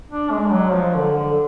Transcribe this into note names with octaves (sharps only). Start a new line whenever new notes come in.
D4
G#3
F#3
F3
D3
D3